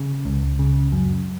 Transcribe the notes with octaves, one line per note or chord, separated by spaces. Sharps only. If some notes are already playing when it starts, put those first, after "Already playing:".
Already playing: C#3
C#2
C#3
F#2